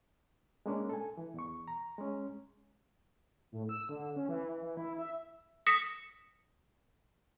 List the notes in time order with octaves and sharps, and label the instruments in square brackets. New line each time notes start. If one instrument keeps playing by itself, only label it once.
[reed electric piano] G#3 A#3 C#4 D4
A4 G#5
E3
E2 C#6
A#5
G#3 C#4
[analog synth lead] A2
E6
D3
C#4
E3
E3
E3
E4
E5
[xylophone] D#6 A#6 B6 C#7 E7